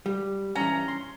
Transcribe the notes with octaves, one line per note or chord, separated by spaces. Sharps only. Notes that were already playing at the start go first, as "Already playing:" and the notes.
G3
G2 E3 C#4 A#5
C6